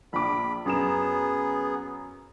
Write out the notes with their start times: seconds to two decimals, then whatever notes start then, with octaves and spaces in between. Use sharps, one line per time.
0.13 A#1 B5 D6
0.66 F#2 B3 G#4 E7